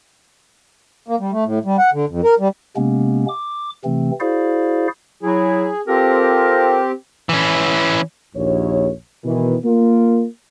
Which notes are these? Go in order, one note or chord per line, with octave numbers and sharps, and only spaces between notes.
A#3
G3
A3
A2
G3
F#5
D3
F2
A#4
G3
C3 G#3 A#3 B3 C#4
D6
C3 E3 A3 C4
E4 F#4 G#4 C5 D5 F5
F#3 E4 G#4
C4 F4 G4 A4 A#4
E3 C#4
A#1 D#2 C#5
B2 D#3 E3
A#3 F4 A#4